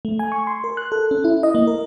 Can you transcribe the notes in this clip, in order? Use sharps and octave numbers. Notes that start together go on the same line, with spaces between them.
A3
G#5
C#6
C6
A#4
F#6
A4
C#4
E4
D#5
A#3
A#4